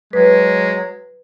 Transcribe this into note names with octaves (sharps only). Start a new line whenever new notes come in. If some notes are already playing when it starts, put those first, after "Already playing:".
F#3 G#3 B4